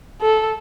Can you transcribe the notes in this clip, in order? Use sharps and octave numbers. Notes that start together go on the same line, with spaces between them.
A4